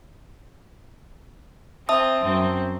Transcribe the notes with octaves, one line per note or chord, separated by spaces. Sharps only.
C4 E5 A5 D#6
F#2 C4